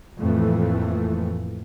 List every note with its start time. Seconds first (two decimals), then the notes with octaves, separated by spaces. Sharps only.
0.20 F2 A2 E3 A3 A#3